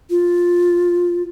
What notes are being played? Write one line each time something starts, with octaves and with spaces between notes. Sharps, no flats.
F4